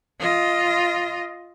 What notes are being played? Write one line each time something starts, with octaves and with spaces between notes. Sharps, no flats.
F4 D#5